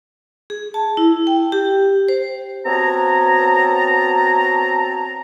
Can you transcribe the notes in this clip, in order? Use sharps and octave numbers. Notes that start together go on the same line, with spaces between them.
G#4
A5
E4
G5
G4
C5
B3 C4 F#4 C#5 A5 A#5